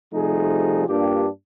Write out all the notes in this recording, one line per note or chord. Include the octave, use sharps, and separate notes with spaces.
C3 F3 G3 A3 D#4 G#4
G2 A#3 D4 F4 G4